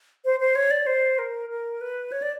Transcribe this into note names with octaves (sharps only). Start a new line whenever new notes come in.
C5
C5
C#5
D5
C5
A#4
A#4
B4
C#5
D5